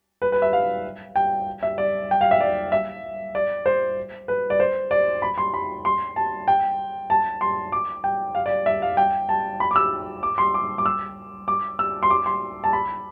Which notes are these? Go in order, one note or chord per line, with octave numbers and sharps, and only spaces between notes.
B4
B4
E5
F5
G5
E5
D5
G5
F5
E5
D5
E5
D5
C5
B4
D5
C5
D5
B5
C6
B5
C6
A5
G5
A5
C6
D6
G5
F5
D5
E5
F5
G5
A5
B5
D6
E6
D6
C6
D6
D6
E6
D6
E6
C6
D6
C6
A5
B5